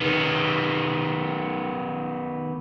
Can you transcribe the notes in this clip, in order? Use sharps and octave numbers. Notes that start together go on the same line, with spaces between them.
D#3 B3